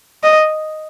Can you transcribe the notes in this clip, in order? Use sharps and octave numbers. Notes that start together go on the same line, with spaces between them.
D#5